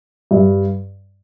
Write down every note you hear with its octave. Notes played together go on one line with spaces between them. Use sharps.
G2